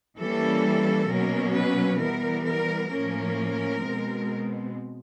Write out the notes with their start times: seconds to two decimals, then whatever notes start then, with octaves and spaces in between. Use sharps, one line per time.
0.18 E3 G3 A#3 C#4 A4
1.09 B2 F#3 A#3 C#4 A#4
1.54 B4
2.01 E3 G3 B3 A#4
2.46 A#4
2.91 A2 F3 A#3 C#4 A#4
3.84 B2 G#3 C4